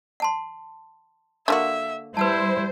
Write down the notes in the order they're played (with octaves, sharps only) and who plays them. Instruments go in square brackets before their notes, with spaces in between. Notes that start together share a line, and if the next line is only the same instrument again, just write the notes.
[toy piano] F#5 A5 C6
[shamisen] D3 A#3 F#4 [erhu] E5
[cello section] G3 C5 [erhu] E4 [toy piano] B4 F#5 A5